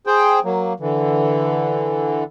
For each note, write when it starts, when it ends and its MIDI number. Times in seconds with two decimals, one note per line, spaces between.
0.07 0.39 68
0.07 0.39 72
0.07 0.39 79
0.44 0.73 54
0.44 0.73 58
0.80 2.24 50
0.80 2.24 52